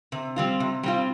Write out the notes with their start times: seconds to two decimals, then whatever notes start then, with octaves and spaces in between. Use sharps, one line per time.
0.12 C3
0.36 G3 C4 F4
0.60 C3
0.83 G3 C4 F4